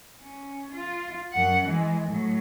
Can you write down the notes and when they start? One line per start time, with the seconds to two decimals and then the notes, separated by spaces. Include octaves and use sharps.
0.21 C#4
0.73 F4
1.33 F#2 F#5
1.66 E3 G#3
2.09 A2 F#3